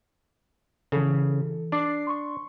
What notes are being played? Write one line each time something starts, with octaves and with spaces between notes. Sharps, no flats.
C#3 E3 A4
D4 D6 C7
C6 C#6